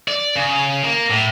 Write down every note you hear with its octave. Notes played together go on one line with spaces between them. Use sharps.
D5
C#3
A#3
A2